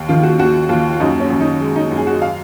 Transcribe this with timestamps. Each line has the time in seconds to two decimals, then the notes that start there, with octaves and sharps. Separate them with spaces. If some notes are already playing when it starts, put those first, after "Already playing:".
Already playing: D#2
0.09 D#3 F4
0.23 F#4
0.39 D#2 F#4
0.69 D#2 F4
0.93 F4
1.00 F#2 D#4
1.20 C#4
1.30 F#2
1.40 D#4
1.60 G#3
1.76 D#4
1.91 F#2
1.97 G#4
2.07 F#4
2.22 F5